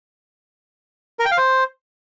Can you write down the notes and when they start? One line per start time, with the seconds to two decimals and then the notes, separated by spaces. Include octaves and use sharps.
1.19 A#4
1.25 G5
1.31 F5
1.37 C5